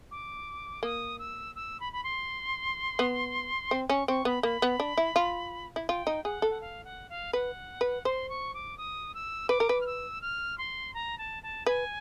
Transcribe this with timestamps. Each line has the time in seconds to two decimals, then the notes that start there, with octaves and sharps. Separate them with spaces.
0.11 D6
0.83 A#3 D#6
1.18 E6
1.55 E6
1.80 B5
1.92 B5
2.03 C6
2.99 B3
3.71 C4
3.89 C#4 C#6
4.08 C4 C#6
4.25 B3 B5
4.43 A#3 B5
4.62 B3
4.80 D4
4.98 E4
5.16 F4
5.76 E4
5.88 F4 G5
6.07 D#4
6.24 G#4 F#5
6.42 A4
6.50 F#5
6.61 F5
6.84 F#5
7.09 F5
7.33 B4 F#5
7.81 B4
8.05 C5 C6
8.29 C#6
8.54 D6
8.77 D#6
9.14 E6
9.49 B4 D6
9.60 A#4
9.69 B4
9.81 F6
9.86 E6
10.21 F6
10.58 C6
10.94 A#5
11.18 A5
11.43 A5
11.66 B4 G#5